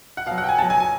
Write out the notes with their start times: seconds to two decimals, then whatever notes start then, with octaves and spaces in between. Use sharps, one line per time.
0.17 F#5
0.26 B2 F5
0.31 F#3
0.38 F#5
0.44 G5
0.49 G#5
0.58 B2 A5
0.62 F#3
0.70 G#5
0.80 G#5